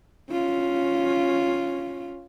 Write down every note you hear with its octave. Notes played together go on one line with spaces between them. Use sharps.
C#4 F4